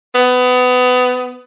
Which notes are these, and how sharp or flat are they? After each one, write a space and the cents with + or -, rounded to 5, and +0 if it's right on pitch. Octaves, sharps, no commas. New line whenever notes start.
B3 +25